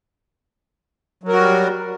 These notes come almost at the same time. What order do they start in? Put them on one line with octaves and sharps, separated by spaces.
F#3 A#4 F#4 G3